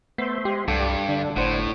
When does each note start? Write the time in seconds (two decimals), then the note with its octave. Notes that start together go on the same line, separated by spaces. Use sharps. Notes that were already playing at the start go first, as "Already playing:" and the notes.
0.18 A3 B3 C5 E5 C6
0.45 G#3 G4
0.68 C2 G2 G4 A4 D5 F#5 G5
1.09 D3 D4
1.36 G1 A2 C5 F#5